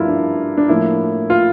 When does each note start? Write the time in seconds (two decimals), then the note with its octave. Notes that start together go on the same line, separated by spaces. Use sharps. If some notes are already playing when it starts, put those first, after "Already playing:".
Already playing: G2 D3 F3 A3 C#4 E4 F4 A#4
0.08 D4
0.57 D4
0.69 A2 F3 A#3 E4
1.30 F4